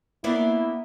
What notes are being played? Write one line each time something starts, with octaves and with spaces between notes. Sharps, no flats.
A#3 B3 D4 E4